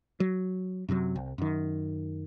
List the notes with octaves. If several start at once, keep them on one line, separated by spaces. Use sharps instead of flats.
F#3
F#2 C3 D#3 F#3
C2
F#2 D#3